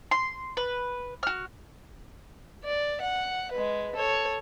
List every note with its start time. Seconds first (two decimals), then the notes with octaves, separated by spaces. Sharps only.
0.11 C6
0.57 B4
1.23 F#4 F6
2.65 D5
3.01 F#5
3.52 G#3 B4
3.95 A4 C#5